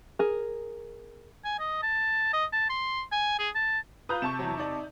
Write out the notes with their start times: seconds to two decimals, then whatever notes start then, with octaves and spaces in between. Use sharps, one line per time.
0.19 G#4 A#4
1.44 G#5
1.59 D#5
1.82 A5
2.33 D#5
2.53 A5
2.69 C6
3.12 G#5
3.39 G#4
3.55 A5
4.09 F4 B4 A#5 D#6 G6
4.22 C3 A5 C#6 E7
4.39 E2 F#3
4.58 D#4 D5